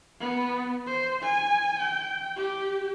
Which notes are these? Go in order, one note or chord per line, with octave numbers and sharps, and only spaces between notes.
B3
C5
G#5
G5
G4